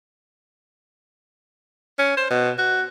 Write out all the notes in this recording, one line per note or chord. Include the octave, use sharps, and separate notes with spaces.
C#4
C5
B2
F#4